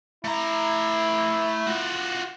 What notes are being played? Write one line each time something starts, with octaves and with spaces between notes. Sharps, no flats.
A3 E4 A#5
F4 F#4